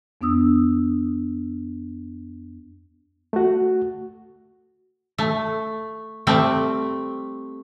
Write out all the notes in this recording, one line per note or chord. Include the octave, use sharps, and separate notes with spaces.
F2 B3 D4 D#6 E6
A3 F#4
A3
G3 A3 C4